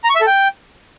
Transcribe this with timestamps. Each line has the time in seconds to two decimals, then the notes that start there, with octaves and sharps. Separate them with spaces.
0.04 A#5
0.10 C#6
0.15 E5
0.21 A4
0.27 G5